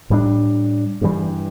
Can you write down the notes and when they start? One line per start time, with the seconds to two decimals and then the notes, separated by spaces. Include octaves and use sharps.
0.10 A2 G3 B3 D4
1.01 G2 E3 G3